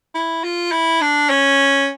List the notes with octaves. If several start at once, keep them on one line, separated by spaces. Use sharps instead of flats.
E4
F4
E4
D4
C#4